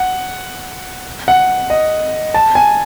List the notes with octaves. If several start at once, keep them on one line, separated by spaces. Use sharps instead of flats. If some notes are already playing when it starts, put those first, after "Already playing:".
Already playing: F#5
F#5
D#5
A5
G#5